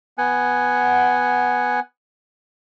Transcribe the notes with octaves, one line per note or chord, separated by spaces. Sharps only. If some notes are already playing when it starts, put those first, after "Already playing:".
B3 F#5 G#5